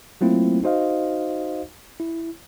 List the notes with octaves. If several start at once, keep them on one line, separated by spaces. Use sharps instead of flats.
F#3 A3 A#3 C4 E4 F4
D#4 F#4 C5 D#5 F5
E4